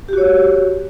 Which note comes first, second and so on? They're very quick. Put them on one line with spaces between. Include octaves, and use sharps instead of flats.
G4 F#4 C#5